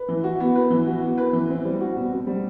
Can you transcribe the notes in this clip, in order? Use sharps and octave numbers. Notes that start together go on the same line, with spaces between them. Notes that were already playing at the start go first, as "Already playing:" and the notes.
Already playing: B4
E3
F#4
B3
B4
E3
F#4
B3
B4
E3
C4
G3
F#4
B2
C4
G3